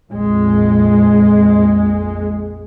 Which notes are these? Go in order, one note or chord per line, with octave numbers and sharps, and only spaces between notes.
A#1 F2 G#3